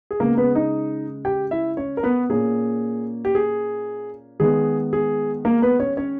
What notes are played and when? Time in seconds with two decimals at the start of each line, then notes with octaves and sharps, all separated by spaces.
0.11 G#4
0.20 C#3 G#3 A#3 B3 A#4
0.37 B3 B4
0.55 D#4 D#5
1.25 G4 G5
1.51 E4 E5
1.77 C#4 C#5
1.97 A#4
2.03 B3 B4
2.29 A#2 A#3 C#4 G#4
3.25 G4
3.35 G#4
4.40 D#3 G#3 B3 G#4
4.93 G#4
5.45 A#3 A#4
5.62 B3 B4
5.80 C#4 C#5
5.97 C#4 C#5